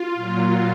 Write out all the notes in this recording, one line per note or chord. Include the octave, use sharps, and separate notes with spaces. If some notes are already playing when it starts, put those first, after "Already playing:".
Already playing: F4
A#2 F#3